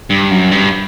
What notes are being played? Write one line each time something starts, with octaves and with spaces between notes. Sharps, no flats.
G2
F#2
G2